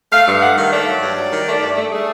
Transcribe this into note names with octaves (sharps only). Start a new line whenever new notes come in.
A3 F5
G2
A3 F#5
D#3 F5
A3 D5
F#3
G2
F#3
D#3
A3
G2
A3
A3 G#4